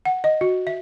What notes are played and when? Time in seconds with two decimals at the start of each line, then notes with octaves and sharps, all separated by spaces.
0.05 F#5
0.24 D#5
0.41 F#4
0.67 E5